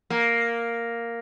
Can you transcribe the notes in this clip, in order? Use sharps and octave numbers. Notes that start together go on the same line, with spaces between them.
A#3